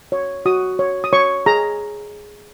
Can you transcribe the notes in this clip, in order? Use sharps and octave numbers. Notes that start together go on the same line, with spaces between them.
C#5
F#4 D#6
C#5
D#6
C#5 C#6
G#4 A#5